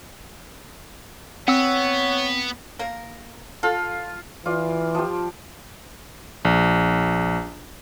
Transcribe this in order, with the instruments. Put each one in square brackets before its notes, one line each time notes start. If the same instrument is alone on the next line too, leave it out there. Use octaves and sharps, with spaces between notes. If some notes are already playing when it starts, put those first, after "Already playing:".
[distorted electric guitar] B3 [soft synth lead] C4 [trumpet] C#5 [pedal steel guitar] F#5 E6
[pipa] A#3 A#4
[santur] F4 [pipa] A4
[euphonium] E3 [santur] F4 D5 F5
[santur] F3 G4
[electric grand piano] A#1